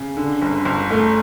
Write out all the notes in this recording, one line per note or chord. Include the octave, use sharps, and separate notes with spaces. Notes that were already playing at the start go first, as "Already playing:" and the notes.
Already playing: C#3
D3
G1
G1
A3